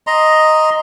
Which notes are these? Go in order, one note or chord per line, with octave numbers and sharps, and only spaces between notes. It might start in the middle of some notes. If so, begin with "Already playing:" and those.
D#5 A#5 C6